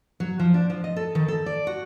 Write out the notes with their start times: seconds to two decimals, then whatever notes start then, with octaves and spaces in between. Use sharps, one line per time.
0.20 F#3
0.39 F3
0.54 D4
0.70 F3
0.84 D#5
0.96 A4
1.15 D#3
1.28 A4
1.46 D5
1.67 F#4